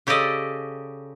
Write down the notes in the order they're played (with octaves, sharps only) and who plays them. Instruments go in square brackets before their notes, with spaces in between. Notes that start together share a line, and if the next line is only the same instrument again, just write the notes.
[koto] C#3 G4 A4 D5 D#5